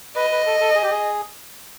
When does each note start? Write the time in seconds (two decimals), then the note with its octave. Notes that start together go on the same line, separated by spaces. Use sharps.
0.16 B4 D#5
0.31 B4
0.47 A4
0.60 A4
0.75 G#4
0.83 G4
0.90 G#4